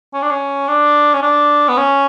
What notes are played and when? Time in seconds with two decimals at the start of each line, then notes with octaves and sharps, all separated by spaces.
0.14 C#4
0.23 D4
0.31 C#4
0.68 D4
1.14 C#4
1.23 D4
1.69 B3
1.77 C#4